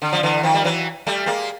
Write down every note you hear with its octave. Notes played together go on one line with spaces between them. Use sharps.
D3
F3
D3 E3
D#3 F3
G3
E3 F#3
G3 A3
G#3 A#3